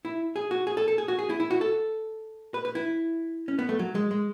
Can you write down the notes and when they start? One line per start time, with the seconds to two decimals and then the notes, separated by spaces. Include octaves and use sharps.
0.05 E4
0.36 G#4
0.51 F#4
0.67 G#4
0.77 A4
0.88 A4
0.98 G#4
1.08 F#4
1.19 G#4
1.30 E4
1.40 E4
1.51 F#4
1.61 A4
2.54 B4
2.65 B4
2.75 E4
3.48 C#4
3.59 B3
3.69 A3
3.79 F#3
3.95 G#3
4.11 G#3